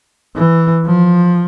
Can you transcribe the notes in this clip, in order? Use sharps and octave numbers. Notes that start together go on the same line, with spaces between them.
E3
F3